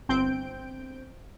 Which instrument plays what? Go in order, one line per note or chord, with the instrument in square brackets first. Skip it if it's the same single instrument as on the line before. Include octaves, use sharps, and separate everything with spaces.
[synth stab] G1 C4 G6 D7